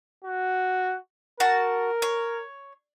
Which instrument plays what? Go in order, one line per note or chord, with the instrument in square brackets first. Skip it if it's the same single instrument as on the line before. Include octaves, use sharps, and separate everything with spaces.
[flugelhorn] F#4
[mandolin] F#4 A5 [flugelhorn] A#4
[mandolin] C#5